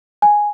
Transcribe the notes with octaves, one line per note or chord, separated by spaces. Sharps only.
G#5